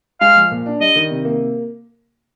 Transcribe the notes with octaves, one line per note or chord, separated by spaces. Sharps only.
G#3 F5
F3
A#2
D4
G3 D#5
D#3
C3
A#3